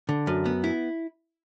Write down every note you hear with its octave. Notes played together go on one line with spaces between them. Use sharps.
D3
F#2
B3
E4